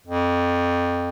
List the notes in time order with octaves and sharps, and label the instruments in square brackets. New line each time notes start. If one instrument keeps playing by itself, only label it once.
[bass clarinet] F2